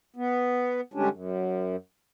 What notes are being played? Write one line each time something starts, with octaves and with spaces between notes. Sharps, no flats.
B3
D3 G3 G#3 C#4 D4
F#2